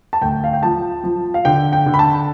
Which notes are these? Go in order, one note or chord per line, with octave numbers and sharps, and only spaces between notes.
A5
D2 G5
F5
G5
F3 A5
F3
F5
D3 G5
G5
D3
B5
A5